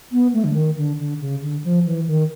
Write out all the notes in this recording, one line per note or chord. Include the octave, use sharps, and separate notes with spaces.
B3
A3
D3
D#3
D3
D3
C#3
D3
F3
E3
D#3